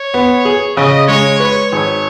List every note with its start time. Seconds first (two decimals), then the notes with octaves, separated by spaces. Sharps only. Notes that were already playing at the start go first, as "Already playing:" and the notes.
Already playing: C#5
0.14 B3
0.45 G#4
0.77 C#3 D#5
1.08 G#3 C#5
1.40 B4 C#5
1.71 G#1 C#5